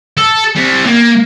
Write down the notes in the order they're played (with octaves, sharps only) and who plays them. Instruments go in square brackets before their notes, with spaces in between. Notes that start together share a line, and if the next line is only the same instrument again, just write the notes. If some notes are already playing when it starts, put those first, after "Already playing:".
[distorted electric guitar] A4
C3 G3
A#3